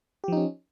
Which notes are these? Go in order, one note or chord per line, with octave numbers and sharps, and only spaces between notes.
F3 C#4 D#4 G4